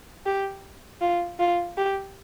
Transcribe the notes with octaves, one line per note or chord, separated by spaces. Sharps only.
G4
F4
F4
G4